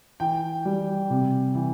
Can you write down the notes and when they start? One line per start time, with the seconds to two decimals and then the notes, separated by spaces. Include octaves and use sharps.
0.20 E3 G5
0.65 G3
1.10 C3
1.55 E3